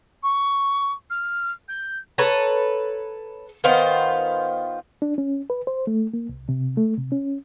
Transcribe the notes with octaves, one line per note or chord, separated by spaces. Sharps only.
C#6
F6
G6
A4 B4 C#5 A#5
D#3 B3 F4 C5
D4
C#4
B4
C5
A3
A#3
C2
C3
A3
C3
C#4